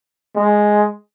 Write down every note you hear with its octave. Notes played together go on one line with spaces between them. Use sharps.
G#3